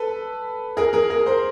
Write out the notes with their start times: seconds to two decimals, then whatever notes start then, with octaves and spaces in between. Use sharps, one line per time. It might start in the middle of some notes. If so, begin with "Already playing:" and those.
Already playing: A4 B4
0.77 G#4 A#4
0.93 G#4 A#4
1.10 G#4 A#4
1.26 A#4 C5